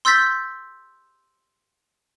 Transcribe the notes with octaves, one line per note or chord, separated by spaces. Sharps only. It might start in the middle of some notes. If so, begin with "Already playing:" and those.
C6 E6 G6 A6 B6